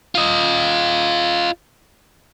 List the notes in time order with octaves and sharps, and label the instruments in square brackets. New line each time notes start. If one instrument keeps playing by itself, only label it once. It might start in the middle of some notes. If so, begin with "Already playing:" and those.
[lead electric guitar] F4 D#5